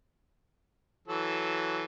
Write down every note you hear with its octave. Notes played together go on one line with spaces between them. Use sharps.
E3 F#3 A4